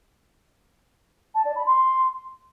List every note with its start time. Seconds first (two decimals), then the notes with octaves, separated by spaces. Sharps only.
1.34 A5
1.45 D5
1.55 B5
1.66 C6